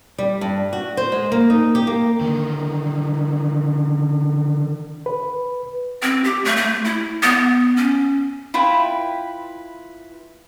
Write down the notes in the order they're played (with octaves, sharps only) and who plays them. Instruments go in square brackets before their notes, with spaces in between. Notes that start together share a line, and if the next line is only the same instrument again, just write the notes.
[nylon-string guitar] G3
G2
F#4
C5
G#3
A#3
D#4
G4
A#3
[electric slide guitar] D3 D#3 A#4
[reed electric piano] B4
[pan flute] C4
G4
A3
A3
E4
B3
C#4
[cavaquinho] E4 F4 B4 G5